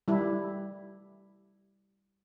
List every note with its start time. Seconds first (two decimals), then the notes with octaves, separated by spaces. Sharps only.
0.08 G3 E4